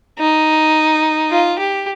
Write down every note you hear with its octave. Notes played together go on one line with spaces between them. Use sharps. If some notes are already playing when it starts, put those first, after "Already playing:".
D#4
F4
G4